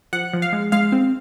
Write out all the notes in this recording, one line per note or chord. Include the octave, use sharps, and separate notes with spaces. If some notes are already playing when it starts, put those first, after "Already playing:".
F3 F#5
F3
F5
G#3
G#3 F5
C4